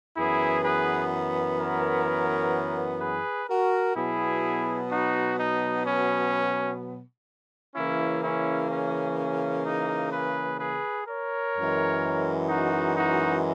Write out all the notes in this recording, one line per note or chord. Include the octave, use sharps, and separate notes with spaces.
F#2 E3 B3 E4 G#4
G#4 B4
A#4 C#5
G#4 B4
F#4 A#4
B2 F#3 B3 E4 G#4
D#4 F#4
D#4
C#4
C#3 E3 A#3 C#4 E4
C#4 E4
C#4
C#4
D#4
G#4 B4
G#4 B4
A#4 C#5
F#2 E3 G#3
D#4 F#4
D#4 F#4